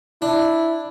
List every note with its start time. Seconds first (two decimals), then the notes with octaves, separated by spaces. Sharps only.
0.22 D4 E4